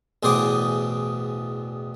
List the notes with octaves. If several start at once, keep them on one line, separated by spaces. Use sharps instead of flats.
A1 E2 B2 G#4 C5 D6